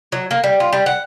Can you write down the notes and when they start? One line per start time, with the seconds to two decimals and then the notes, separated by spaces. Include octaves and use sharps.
0.12 F#3
0.31 A#3
0.44 G3
0.60 F4
0.73 G3
0.86 F#5